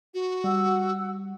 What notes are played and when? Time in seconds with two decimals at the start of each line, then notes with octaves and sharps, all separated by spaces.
0.14 F#4
0.44 G3 F#5 E6